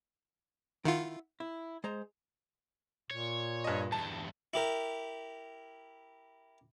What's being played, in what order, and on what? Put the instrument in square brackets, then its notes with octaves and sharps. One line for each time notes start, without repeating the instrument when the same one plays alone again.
[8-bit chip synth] D#3 F4 [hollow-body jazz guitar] E4 E5 F#5
[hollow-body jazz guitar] E4
G#3 C5 A#5
[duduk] A#2 [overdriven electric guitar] C#5
[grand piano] G2 D#5
[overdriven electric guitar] E2 G2 [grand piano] A5
[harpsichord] E4 G4 A#4